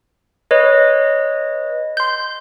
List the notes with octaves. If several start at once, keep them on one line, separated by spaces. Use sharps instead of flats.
B4 C#5 D#5
C6 G6